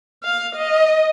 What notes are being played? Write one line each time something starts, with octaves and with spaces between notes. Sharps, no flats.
F5
D#5